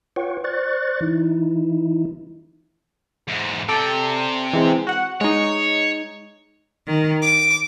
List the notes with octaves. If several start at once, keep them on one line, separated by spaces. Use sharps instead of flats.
F4 B4 C#5 F#5 G5 C#6
C5 D5 C#6 F#6 A6
E3 D#4 E4
E2 G#2
C3 A4 D5 G5
E3 G#3 C4
F#4 F#5
G#3 D#4 C#5
D#3
D6